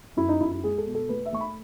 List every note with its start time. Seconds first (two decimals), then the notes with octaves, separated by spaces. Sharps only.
0.17 F#2 E4
0.29 D#4
0.41 F#2 E4
0.52 E4
0.64 G#3 G#4
0.78 A4
0.86 B2
0.95 A4
1.09 A3 B4
1.26 E5
1.32 A3 C#6
1.41 B5